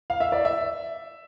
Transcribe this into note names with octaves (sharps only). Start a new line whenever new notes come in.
F5
E5
D5
E5